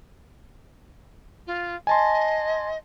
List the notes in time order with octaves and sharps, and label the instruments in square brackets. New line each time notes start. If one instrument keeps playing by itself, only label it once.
[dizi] F4
[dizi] D#5 [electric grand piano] G#5 A5 C6